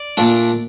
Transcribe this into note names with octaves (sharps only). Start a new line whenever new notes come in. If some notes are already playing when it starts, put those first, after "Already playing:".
Already playing: D5
A#2 A3 D4